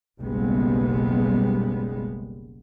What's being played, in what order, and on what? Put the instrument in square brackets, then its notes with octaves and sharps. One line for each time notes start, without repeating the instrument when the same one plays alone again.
[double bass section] F#1 B1 G3 G#3 B3